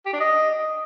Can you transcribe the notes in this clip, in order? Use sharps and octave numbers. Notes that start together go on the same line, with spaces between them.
G4
D4
D#5